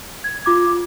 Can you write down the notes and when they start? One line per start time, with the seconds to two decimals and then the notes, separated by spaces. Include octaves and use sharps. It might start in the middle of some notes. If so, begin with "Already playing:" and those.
0.24 G#6
0.45 F4 D6 G#6